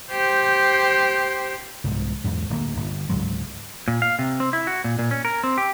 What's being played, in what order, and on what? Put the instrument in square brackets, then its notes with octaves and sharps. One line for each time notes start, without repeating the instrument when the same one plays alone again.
[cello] G4 C5
[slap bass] C2 G#2
E2 G#2
D1 G#3 A#3
G1
C#2 G#2 F#3 G#3
[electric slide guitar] A#2
F5
C3
C4
E4
F#4
A#2
A#2
C#4
A#4
C4
G4